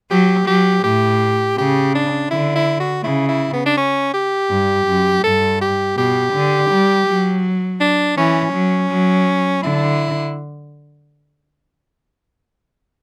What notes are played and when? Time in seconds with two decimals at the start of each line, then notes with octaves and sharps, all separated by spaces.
0.11 F#3 G4
0.47 F#3 G4
0.83 A2 G4
1.57 C#3 G4
1.95 D4
2.31 D3 E4
2.55 E4
2.80 F#4
3.03 C#3 E4
3.29 E4
3.53 B3
3.66 D4
3.77 C#4
4.13 G4
4.50 G2
4.87 F#2
5.24 G2 A4
5.61 G4
5.97 B2 G4
6.34 D3
6.71 G3
7.07 F#3
7.80 D4
8.17 E3 C#4
8.53 F#3
8.90 F#3
9.63 D3 E4